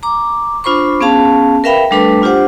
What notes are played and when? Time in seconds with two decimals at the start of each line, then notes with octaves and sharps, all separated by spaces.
0.03 A#5 D6
0.64 D4 F4 C5 B5 C#6
1.01 B3 C#4 G#4 F5 A5
1.64 A#4 B4 E5 F5 G5 B5
1.91 G3 A3 D4 A4 B4
2.22 D4 F4 G4 C5 F#5